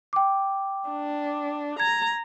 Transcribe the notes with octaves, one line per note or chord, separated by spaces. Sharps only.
G5 D6
D4
A#5 G#6